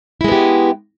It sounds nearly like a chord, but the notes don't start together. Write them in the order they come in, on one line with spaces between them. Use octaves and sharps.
E4 G#3 B3 G4